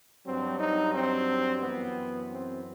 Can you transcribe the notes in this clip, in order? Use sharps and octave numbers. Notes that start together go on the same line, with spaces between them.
G2 F#3 C4
D#4
C4
F#2 E3 B3
C4